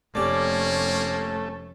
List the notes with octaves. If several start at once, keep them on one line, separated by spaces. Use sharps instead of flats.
F1 A3 A#3 C#4 G4 D5